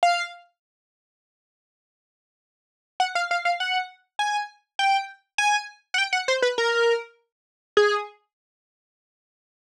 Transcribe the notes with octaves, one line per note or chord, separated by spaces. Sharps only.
F5
F#5
F5
F5
F5
F#5
G#5
G5
G#5
F#5
G5
F#5
C5
B4
A#4
G#4